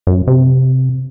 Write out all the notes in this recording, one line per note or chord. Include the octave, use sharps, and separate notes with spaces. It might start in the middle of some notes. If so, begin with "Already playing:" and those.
F#2
C3